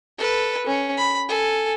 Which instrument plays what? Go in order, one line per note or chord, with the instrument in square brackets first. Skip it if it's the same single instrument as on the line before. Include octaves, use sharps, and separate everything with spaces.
[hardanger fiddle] A4 B4
C#4
B5
A4 G#5